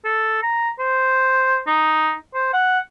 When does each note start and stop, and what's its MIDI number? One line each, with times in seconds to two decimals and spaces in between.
0.05 0.42 69
0.43 0.70 82
0.79 1.60 72
1.67 2.14 63
2.34 2.51 72
2.53 2.79 78